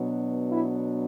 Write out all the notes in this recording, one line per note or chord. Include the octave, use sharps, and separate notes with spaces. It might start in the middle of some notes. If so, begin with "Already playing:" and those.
Already playing: B2 F#3 B3 D4
E4